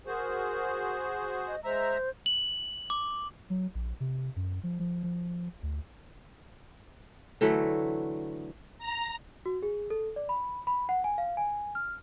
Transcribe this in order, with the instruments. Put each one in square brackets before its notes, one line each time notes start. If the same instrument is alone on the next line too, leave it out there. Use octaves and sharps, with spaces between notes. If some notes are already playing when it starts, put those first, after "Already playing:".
[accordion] F#4 G#4 C5 [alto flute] A#4
[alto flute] D#5
[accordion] G#3 E5 A#5 [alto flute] C5
[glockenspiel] F#7
D6
[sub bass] F#3
A#1
C3
F#2
F3
F3
F3
D2
[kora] D3 E3 F#3 A3
[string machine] A#5
[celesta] F#4
G#4
A4
D5
B5
B5
F#5
G#5
F5
G#5
F6